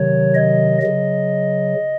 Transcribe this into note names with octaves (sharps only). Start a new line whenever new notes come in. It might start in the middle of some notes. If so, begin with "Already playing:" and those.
Already playing: C3 D#3 F#3 C#5
D#5
C#3 F#3 D#5